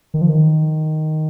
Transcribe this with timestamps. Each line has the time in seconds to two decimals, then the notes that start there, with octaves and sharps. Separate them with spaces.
0.14 D#3
0.21 F3
0.29 D#3